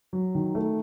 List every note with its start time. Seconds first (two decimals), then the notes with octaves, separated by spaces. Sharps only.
0.13 F#3
0.35 D#3
0.55 A3